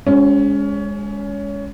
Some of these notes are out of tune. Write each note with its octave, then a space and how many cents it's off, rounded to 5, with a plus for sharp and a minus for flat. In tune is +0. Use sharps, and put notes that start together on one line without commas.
G#3 -15 C#4 +25 C#5 -40